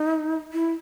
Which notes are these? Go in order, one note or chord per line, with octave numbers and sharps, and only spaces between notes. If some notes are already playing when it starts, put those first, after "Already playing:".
Already playing: D#4
E4